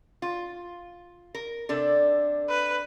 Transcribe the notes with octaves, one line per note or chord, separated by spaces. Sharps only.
F4
A#4
C3 D4 A4
B4